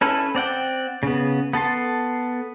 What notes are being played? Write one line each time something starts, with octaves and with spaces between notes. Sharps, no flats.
C#4 E4 A4 B4
C4 D5 F#5 G5
C#3 B3
B3 A4 A5 C6